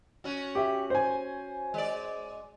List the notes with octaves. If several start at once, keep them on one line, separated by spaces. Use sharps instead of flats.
C#4 F#4
G4 E5
C5 G#5
G#3 D5